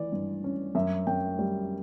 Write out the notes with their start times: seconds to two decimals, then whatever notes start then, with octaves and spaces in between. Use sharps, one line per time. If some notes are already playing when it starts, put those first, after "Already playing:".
Already playing: E3 D5
0.12 G2
0.44 C#4
0.75 F#2 E5
1.07 F#2 G5
1.39 G3